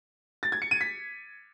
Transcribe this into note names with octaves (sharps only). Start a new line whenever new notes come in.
A6
G#6
C#7
D#7
B6